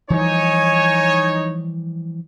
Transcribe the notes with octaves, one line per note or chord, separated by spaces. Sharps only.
E3 F3 G3 D#4 C#5 G#5